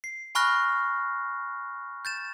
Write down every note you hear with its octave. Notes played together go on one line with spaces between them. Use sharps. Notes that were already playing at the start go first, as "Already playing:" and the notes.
C7
G#5 B5 C#6 F6 F#6 A#6
G6 A6 E7